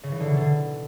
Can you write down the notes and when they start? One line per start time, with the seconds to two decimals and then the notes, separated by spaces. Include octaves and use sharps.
0.03 C#3
0.12 E3
0.20 D3
0.29 B2
0.37 D3